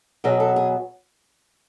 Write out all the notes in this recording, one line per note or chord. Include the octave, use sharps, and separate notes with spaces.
B2 F#3 B3 G#4
A4
G#4